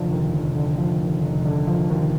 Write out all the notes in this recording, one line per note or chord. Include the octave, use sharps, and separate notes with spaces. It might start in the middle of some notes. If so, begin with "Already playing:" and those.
Already playing: F1 D3 F3
D#2
F1
D3
F3
D#2
F1
D3
F3
D#2